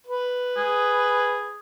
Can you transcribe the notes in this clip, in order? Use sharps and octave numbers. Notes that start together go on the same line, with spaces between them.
B4
G#4